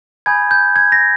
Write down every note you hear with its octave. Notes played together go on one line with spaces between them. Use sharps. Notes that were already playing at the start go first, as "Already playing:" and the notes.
G#5 B5 D#6 G6 G#6
G6
G#6
A#6